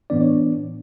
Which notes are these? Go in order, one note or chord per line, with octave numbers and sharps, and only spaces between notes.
A2 E3 B3 D4 D5
C#5